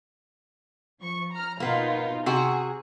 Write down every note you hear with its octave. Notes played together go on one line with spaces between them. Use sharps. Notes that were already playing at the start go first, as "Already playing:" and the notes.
F3 C#6
A#5 F6
B2 A#3 B3 D#4 F4
C3 F#4 G#4